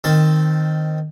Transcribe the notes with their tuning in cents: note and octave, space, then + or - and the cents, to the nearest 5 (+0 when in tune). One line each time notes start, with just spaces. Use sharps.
D#3 -5 C4 +0 A5 +10